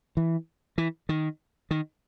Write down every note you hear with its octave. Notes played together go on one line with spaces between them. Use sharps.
E3
E3
D#3
D#3